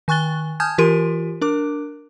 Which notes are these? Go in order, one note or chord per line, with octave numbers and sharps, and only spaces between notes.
D#3 G#5 C#6 F#6 A6 G7
G#5 A5 D#6 F6 G6 G#6
E3 F4 G4 A#4 C6 D#7
D4 A#4 D6